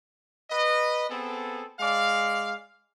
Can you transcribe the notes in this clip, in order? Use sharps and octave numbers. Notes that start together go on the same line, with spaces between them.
B4 D#5
B3 C4 G#4 A4
G#3 D5 F5